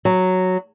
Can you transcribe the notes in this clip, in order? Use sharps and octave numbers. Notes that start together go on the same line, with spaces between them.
F#3